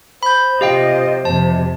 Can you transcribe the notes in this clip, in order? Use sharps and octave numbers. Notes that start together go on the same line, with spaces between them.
C5 B5 G6
C3 F4 G4 D#5 F5 G5
F2 C3 A5